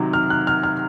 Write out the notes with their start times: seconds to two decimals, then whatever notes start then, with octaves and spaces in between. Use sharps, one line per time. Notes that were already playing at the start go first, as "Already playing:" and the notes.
Already playing: C3 D#3 F#3
0.13 F6
0.30 F#6
0.47 F6
0.63 F6